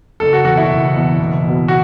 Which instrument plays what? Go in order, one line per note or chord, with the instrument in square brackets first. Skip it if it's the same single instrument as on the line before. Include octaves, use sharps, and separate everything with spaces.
[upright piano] F#1 [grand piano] A4
[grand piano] F#4
[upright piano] E2 [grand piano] F#4
[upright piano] B2
[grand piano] E4
[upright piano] F#1
E2 B2
F#1
E2 B2
[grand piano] F#4